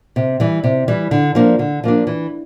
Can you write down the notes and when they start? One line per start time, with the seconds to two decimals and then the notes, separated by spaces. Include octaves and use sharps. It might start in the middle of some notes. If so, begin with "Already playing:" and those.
0.16 C3
0.40 E3 G3
0.64 C3
0.88 E3 G3
1.11 D3
1.35 F3 A#3 D4
1.59 D3
1.84 F3 A#3 D4
2.07 E3